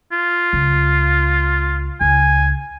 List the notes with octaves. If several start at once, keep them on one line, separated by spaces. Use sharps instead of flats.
F4
C#2
C#2 G#5